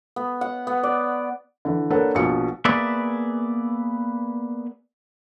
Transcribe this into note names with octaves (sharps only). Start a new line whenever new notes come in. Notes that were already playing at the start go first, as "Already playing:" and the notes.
B3
F#5
B3
D5
D3 E3
A#3 D4 A4 B4 C#5 F#5
A#1 B2 C#7
A#3 B3 G#4 B4 D5 E5